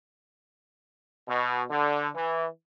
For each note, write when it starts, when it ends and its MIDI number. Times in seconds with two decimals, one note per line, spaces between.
1.28 1.63 47
1.70 2.07 50
2.15 2.45 52